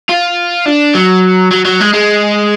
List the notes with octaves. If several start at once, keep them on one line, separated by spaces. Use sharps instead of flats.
F4
D4
F#3
F#3
F#3
G#3
G#3